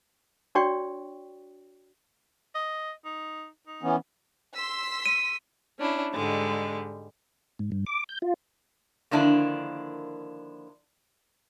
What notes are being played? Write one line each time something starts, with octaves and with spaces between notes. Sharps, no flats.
D4 F#4 C#5 D5 G5 C#6
D#5
D#4
D#4
E3 B3 C#4
C6 E6 B6
D#7
C#4 D4 E4
G#2 D3 G3 G#3
G#2
G2
D6
G6
F4
D3 D#3 F3 A#3 D4 E4